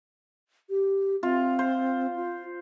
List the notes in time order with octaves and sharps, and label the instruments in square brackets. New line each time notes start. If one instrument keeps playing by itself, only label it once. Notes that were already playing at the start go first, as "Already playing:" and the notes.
[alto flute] G4
[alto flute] C4 [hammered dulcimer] F4
[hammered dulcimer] C5
[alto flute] F4